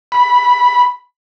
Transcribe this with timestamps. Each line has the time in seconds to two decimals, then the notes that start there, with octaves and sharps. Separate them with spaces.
0.12 B5